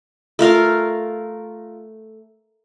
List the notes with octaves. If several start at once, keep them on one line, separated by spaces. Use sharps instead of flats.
A3 F4 A#4 F5